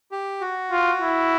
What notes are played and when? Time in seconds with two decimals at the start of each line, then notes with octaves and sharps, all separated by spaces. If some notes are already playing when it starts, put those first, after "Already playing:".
0.11 G4
0.41 F#4
0.71 F4
1.01 E4